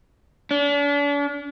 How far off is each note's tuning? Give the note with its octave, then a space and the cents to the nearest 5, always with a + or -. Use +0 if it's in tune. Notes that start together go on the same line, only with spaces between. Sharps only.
D4 -40